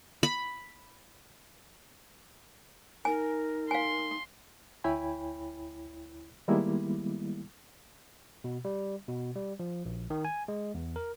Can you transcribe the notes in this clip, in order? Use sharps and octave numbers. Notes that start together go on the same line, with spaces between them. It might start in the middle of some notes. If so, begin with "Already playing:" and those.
B5
D#4 A#4 G#5
F5 G#5 C6
D2 E4 C#5 G5 G#5 B5
D#3 G3 G#3 A#3 B3 E4
B2
G3
B2
G3
F3
A#1
D#3
G#5
G#3
E2
A#4